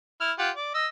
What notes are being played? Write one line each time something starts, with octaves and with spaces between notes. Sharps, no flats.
E4 F6
F4 G4 F#5
D5
D#5 E6